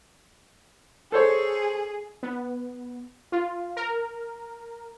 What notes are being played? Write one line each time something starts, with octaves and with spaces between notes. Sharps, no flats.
G#4 A4 C5 C#5
B3
F4
A#4